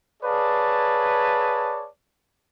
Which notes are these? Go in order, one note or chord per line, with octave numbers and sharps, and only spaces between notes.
G#4 B4 C#5 D5 F5 A5